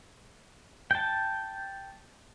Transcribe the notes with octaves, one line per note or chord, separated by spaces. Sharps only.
G5 A5